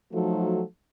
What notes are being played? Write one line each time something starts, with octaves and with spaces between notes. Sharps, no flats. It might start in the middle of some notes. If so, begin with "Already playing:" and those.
F3 F#3 A3 D#4 F#4 A4